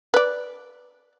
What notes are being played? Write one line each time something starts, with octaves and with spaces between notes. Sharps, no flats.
B4 D5